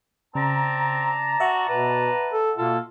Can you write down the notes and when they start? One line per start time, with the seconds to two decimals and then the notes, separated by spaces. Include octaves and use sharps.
0.35 C#3 C4 D5 A5 A#5
1.40 F#4 E5 F#5
1.69 B2 B4
2.33 A4
2.58 B2 A#3 F4 A4